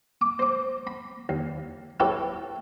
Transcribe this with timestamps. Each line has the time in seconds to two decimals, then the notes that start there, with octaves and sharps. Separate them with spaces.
0.21 D6
0.39 C5 D6
0.87 B5
1.29 D#2
2.00 E4 G4 A4 B4 C#5